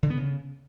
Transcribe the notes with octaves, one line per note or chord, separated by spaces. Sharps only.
D3
B3
C#3